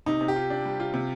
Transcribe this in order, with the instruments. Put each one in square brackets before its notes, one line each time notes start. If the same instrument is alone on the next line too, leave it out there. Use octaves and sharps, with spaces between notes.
[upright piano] C3 [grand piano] D#4
[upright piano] C3
[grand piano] G4
[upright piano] F4
D4
G3
F4
C3